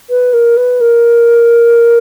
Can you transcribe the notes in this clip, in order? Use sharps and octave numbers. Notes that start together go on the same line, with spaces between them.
B4
A#4
B4
A#4